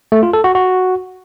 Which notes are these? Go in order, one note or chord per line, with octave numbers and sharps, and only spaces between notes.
A3
F4
A4
F#4
F#4